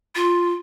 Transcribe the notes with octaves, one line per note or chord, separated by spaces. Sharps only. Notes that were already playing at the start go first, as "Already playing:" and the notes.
F4